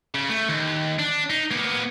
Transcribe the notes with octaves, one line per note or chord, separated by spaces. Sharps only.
C#3
A3
D#2
D4
D#4
A#3 B3